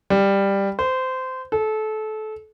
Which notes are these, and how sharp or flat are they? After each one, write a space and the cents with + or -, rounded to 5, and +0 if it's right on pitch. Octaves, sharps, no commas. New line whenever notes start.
G3 +10
C5 -20
A4 -25